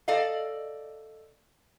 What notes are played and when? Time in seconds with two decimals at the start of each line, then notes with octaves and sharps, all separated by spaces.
0.08 A4 D5 D#5 F5